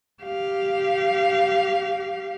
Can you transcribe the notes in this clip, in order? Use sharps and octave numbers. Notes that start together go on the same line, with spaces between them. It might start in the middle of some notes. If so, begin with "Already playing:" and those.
G4 F5